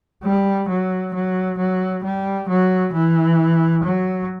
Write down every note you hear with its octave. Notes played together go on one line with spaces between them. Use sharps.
G3
F#3
F#3
F#3
G3
F#3
E3
F#3